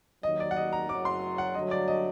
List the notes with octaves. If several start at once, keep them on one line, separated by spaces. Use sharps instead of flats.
D#2 D#3 F#3 D#5
D5
F#5
D#5
A#5
F#1 F#2 F#3 D6
C6
F#5
G2 D3 F#3 A3 D#5
D5
D#5